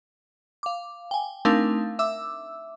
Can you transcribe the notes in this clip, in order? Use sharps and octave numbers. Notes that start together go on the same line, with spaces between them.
F5 D6
G5 G#5
A3 C4 D4 D#4 A#4 F5
E5 D6 E6